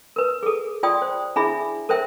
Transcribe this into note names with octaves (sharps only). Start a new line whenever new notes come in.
A#4 B4
G#4 A4
F4 D5 G5 C6 D#6
C5
D4 E4 G#4 E5 B5
A4 A#4 C5 E5 G5